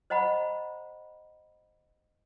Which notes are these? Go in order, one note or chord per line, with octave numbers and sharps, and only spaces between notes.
C5 D#5 F#5 A#5 B5